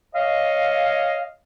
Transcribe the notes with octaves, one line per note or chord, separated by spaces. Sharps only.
C#5 D#5 F5